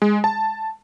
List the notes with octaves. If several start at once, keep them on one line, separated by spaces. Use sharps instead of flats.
G#3
A5